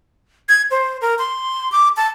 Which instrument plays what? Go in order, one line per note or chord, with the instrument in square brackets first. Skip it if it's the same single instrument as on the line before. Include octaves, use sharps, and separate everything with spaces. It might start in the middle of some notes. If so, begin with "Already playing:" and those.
[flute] G#6
C5
A#4
C6
D6
A5